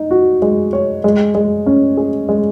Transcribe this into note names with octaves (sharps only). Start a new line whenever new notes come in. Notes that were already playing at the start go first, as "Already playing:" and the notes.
Already playing: D#4
F#4
G#3
C#5
G#3
G#3
C#4
G#4
G#3